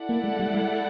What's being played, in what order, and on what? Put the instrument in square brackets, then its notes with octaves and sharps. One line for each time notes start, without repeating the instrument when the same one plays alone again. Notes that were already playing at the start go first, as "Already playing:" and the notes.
Already playing: [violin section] E4 A4 D5 F#5
[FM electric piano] A#3
G#3
G3
G#3